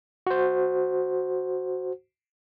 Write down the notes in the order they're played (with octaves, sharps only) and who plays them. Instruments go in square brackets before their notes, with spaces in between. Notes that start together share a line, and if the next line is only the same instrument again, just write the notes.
[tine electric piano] F#4 C5